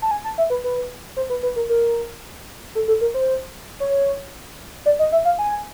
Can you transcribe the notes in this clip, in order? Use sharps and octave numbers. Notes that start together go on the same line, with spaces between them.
A5
G#5
A5
E5
B4
B4
C5
B4
B4
A#4
A#4
A4
A4
A#4
C5
C#5
D5
D#5
E5
F5
G#5